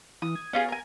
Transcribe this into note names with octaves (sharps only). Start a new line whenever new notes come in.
E3 D#6
G#6
B3 C#4 F4 G#4
A#4 G#5